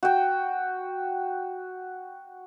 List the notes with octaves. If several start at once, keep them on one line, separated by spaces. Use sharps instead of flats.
F#4 G5